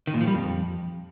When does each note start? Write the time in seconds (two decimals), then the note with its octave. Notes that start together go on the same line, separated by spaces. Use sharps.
0.07 D#3
0.14 A#2
0.21 F3
0.27 G3
0.34 F2